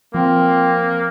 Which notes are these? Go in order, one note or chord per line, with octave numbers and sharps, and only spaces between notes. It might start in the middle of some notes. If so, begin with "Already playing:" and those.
F3 A#3 C4